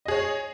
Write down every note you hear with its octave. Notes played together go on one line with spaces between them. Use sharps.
G#4 C#5 D#5